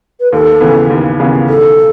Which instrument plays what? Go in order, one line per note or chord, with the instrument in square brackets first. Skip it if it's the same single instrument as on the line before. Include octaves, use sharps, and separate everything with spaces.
[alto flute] B4
[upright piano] D#2 [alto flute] A4
[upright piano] C#3 E3 B3
D#2
C#3 E3 B3
[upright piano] B1 [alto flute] A4